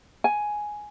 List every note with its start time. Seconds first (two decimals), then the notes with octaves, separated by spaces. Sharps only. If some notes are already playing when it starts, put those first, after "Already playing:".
0.24 G#5